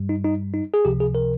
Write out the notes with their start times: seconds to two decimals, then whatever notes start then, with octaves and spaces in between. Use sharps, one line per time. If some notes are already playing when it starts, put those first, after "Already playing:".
Already playing: G2 G3
0.09 D#4
0.24 D#4
0.54 D#4
0.74 G#4
0.85 C#2 C3 F3 G4
1.00 G#4
1.15 A#4